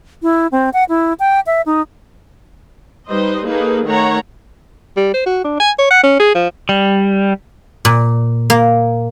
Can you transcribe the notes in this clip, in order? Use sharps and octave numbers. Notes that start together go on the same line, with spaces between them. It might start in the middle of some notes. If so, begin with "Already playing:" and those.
E4
C4
F#5
E4
G5
E5
D#4
G3 D#4 B4 C5 D#5
A#3 D#4 G#4 A4 B4
D#3 A3 C#5 F#5 A#5
G3
C5
F#4
D4
G#5
C#5
F#5
C#4
G#4
F3
G3
A#2
A#3